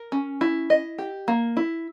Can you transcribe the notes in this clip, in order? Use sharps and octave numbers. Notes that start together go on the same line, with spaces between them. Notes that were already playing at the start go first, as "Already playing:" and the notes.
Already playing: A#4
C#4
E4
D#5
G4
A#3
E4